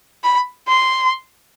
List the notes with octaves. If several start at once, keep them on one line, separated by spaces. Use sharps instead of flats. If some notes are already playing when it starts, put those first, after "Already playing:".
B5
C6